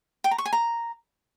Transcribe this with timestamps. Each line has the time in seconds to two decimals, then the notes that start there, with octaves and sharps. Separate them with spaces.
0.24 G5
0.31 A#5
0.38 C#6
0.45 G#5
0.53 A#5